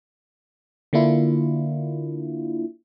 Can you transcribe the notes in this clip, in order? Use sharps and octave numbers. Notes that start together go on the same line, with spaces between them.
D3 A#3 D4 E4 F4